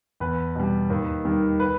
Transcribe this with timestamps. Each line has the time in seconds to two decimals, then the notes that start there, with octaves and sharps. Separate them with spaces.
0.20 E2 B4
0.55 B2 G3
0.90 D#2
1.25 D#3 G3
1.60 B4